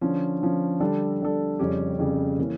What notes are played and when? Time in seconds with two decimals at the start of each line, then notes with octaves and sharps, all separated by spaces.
0.01 D3 F3 C#4
0.41 D3 F3 C#4
0.80 D3 G3 D4 A4
1.21 D3 G3 D4 A4
1.59 F2 C#3 G3 C#4 G4
1.98 F2 C#3 G3 C#4 G4
2.39 E3 A#3 C#4